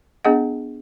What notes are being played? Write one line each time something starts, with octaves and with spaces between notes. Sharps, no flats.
B3 D4 G#4 D#5 F#5